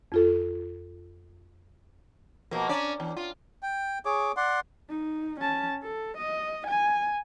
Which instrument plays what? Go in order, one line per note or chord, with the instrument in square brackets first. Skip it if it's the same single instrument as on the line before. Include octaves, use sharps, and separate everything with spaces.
[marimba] F2 F4 A4
[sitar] B2 F3 A#3
C#4 D4 D5
E2
F4
[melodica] G5
G#4 C#5 D6
D5 F#5 C6
[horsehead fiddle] D#4
C#4 A5
A4
D#5
G#5